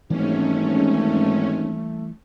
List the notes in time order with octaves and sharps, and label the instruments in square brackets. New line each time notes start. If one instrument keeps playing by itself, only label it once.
[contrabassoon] G#1 [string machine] G#2 C#4 [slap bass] E3 G3 A#3 [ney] A3